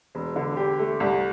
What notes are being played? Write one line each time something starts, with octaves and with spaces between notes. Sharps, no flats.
E1
D3
G4
A3
C2